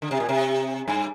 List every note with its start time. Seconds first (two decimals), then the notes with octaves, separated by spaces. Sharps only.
0.02 D3
0.11 C3
0.20 A#2
0.29 C3
0.88 G2